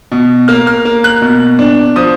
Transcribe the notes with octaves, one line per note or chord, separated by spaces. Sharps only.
B2
A#3 F6
F6
A#3
F#6
B2
D4
F3 D#6